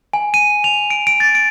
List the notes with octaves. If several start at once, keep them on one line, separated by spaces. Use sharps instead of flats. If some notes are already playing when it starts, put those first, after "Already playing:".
G#5
D#7
F7
D7
D7
A6
D7